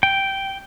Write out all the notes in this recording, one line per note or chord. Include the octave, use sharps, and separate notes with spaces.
G5